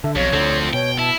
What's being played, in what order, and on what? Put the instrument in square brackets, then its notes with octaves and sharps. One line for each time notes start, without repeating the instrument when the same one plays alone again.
[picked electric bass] D3 [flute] E5
[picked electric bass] B1 [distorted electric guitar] F2 [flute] C#5
[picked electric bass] D2 D3 [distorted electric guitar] F3 C4
[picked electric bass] B2 [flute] C#5 [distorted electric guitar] G5
[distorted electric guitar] E4 [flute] A5